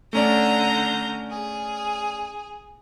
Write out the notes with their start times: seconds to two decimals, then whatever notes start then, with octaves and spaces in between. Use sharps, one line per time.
0.13 D3 A3 C#4 D5 A#5 G6
1.30 G#4